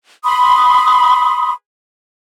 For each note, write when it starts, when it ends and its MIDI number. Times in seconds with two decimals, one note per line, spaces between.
0.24 1.52 83
0.24 1.52 84
0.24 1.52 87